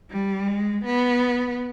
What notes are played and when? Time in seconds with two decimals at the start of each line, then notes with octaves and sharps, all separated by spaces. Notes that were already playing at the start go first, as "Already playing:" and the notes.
0.11 G3
0.48 G#3
0.85 B3